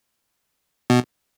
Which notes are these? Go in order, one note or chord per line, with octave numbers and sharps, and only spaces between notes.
B2